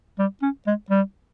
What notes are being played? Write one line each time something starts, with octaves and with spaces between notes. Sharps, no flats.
G3
C#4
G#3
G3